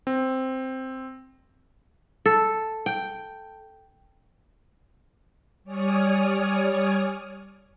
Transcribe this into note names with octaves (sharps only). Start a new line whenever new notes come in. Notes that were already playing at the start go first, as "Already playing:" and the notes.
C4
A4
G5
G3 C#5 D5 G#5 D#6 F6